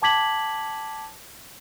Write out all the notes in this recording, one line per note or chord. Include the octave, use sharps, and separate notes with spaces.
G5 A5 D6 G#6 B6 F#7